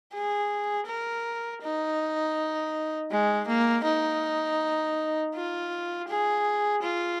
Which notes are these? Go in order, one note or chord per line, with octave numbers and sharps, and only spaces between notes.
G#4
A#4
D#4
G#3
A#3
D#4
F4
G#4
F4